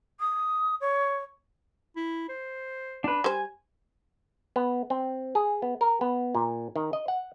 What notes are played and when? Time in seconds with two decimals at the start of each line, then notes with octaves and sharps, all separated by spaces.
0.20 D#6
0.81 C#5
1.96 E4
2.29 C5
3.04 D4 B4
3.24 G3 C5 G#5
4.56 B3
4.90 C4
5.35 G#4
5.62 B3
5.81 A#4
6.01 B3
6.35 A#2
6.76 D#3
6.93 D#5
7.08 F#5